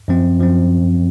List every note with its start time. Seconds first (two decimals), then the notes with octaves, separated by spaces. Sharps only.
0.08 F#2 F3 C4
0.40 F#2 F3 C4